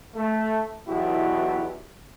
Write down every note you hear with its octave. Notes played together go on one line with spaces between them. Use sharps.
A3
B1 E2 E4 F#4 G4